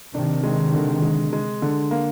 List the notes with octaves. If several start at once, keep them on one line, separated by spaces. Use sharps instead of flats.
C3 D#3 D4
G#3
D3
G#3
G#3
D3
A#3